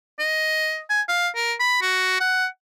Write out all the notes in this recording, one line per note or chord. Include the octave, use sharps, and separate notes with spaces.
D#5
G#5
F5
A#4
B5
F#4
F#5